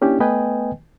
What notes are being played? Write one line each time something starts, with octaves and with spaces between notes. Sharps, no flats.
A#3 C#4 D4 E4 G4
A3 B3 B4 D#5 G5 G#5